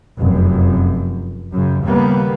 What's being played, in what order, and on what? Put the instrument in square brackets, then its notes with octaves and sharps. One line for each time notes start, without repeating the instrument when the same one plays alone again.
[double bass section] F1 F#2
F#2 C#3
D#2 C#3 G3 A#3 B3